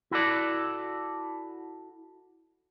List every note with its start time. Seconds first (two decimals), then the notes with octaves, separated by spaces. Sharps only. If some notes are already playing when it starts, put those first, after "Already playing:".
0.11 E4 F#4 A4 D5